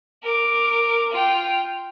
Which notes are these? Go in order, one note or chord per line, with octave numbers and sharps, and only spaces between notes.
A#4 D6
F4 G5